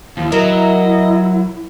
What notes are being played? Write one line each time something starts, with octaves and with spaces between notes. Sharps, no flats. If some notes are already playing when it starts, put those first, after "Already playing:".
D#2 F3 E4
F#3 A#4 D#5 E5